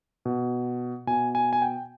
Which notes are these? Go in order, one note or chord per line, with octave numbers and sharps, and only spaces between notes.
B2
B2 G#5
G#5
G#5
G5